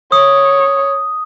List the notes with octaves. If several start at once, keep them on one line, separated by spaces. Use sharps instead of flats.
C#5 D#6